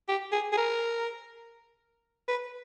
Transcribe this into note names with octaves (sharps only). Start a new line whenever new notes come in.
G4
G#4
G#4
A#4
B4